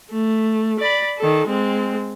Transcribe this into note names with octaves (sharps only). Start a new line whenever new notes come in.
A3
D5 B5
D#3 A4
G#3 C4